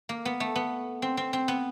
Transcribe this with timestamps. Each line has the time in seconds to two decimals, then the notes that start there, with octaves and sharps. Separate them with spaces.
0.09 A#3
0.25 B3
0.40 A3
0.56 B3
1.02 C4
1.17 C4
1.33 C4
1.48 B3